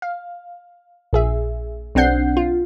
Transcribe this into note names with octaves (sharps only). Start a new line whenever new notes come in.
F5
A#1 G#4 E5
B1 C4 D4 F#5 G6 C7
F4